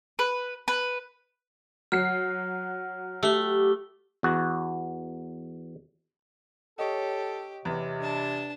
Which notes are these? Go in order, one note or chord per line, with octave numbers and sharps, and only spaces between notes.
B4
B4
F#3 F6 C7
A3 G4 E6 G7
E2 F#4
G4 A4 C#5 D#5
E2 C3
D4 A5